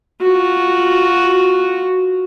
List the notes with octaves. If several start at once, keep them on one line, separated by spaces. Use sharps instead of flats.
F4 F#4